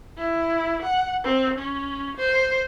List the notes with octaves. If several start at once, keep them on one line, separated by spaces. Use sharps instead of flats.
E4
F#5
C4
C#4
C5